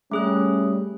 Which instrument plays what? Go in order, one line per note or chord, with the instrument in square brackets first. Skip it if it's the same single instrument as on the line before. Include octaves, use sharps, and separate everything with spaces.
[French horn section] G3 C#4 [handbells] A3 G#4 F#6